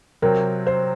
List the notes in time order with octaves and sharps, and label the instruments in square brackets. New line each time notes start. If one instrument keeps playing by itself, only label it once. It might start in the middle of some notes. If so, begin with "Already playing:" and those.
[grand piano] C3 F#3 C4 [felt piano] A#4
[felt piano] C5